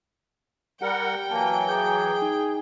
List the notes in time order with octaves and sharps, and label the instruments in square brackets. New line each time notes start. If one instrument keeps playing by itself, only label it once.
[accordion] G3 A#4 F#5 [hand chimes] G4 [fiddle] G5
[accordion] E3 F#3 [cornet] A#3 [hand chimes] G#5 A5
[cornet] G#4 [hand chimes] A#5 D6 G6
[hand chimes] D#4